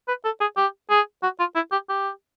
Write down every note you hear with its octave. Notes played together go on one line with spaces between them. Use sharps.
B4
A4
G#4
G4
G#4
F#4
F4
E4
G4
G4